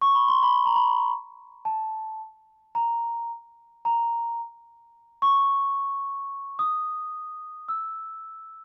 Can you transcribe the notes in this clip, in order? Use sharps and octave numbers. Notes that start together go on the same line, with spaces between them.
C#6
B5
C6
B5
B5
A#5
B5
A5
A#5
A#5
C#6
D#6
E6